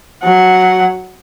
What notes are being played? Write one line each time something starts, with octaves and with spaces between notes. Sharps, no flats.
F#3 F#5